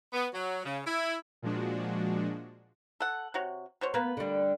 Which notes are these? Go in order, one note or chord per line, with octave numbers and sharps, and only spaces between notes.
B3
F#3
C#3
E4
A#2 F3 G#3 D4 F#4
A4 F#5
C3 F#4 C#5
B2 C5 C#5
A#3 B3 B4
D3 G3